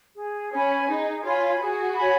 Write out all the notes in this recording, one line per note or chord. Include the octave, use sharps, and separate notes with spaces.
G#4
C#4 C#5 G#5 B5
D#4 G#4
F4 C#5 G#5 B5
F#4 G#4
C#5 G#5 B5